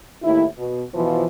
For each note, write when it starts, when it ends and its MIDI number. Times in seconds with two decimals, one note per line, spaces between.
0.23 0.44 39
0.23 0.44 45
0.23 0.44 64
0.57 0.82 47
0.93 1.24 47
0.93 1.24 52
0.93 1.24 53